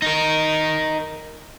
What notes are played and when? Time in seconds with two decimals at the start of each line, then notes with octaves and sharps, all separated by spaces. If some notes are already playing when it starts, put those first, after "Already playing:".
0.02 D#4 A#4